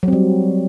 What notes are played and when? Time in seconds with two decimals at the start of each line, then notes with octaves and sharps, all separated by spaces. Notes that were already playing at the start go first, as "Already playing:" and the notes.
0.03 F#3
0.08 C4
0.13 G3